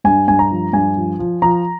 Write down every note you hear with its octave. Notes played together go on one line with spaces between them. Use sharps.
G2 G#5
G2 G#5
A#5
F3
G2 G#5
F3
F3
F3 A#5